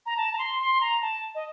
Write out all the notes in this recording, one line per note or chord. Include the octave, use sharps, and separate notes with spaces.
A#5
A5
A#5
C6
C6
A#5
A5
D#5